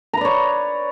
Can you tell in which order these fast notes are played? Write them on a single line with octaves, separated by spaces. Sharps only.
A#5 B4 D5 C#5